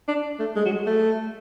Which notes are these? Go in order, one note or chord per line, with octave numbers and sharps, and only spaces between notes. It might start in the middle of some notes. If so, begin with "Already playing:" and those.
D4
A3
G#3
F#3
G#3
A3